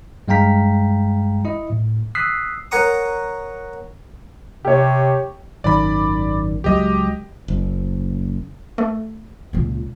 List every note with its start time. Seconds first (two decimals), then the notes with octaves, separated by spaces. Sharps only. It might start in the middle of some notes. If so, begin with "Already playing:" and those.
0.28 G2 G#3 F5 G5 A#5 B6
1.45 E4 D#5
1.70 A2
2.15 D#6 E6 F#6 B6 C7
2.71 A#4 C#5 F#5 A#5 C#6 D#6
4.65 C3 G4 C#5
5.64 G#1 F#2 D#3 D5 B5
6.64 C#2 F#3 G#3 G4 D#5
7.48 F#1
8.78 A3
9.53 C#2 A#2